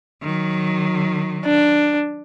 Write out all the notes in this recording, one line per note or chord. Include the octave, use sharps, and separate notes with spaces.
D#3 F#3
D4